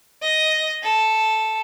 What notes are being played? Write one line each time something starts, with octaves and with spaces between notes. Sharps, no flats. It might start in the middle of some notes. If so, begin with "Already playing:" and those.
D#5
A4